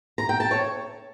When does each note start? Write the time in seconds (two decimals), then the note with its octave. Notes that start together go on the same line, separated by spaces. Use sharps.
0.18 A#5
0.29 G5
0.40 A5
0.51 C#5